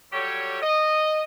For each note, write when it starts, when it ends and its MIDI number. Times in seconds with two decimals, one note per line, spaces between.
0.13 0.61 54
0.13 0.61 55
0.13 0.61 67
0.13 0.61 69
0.13 0.61 73
0.61 1.22 75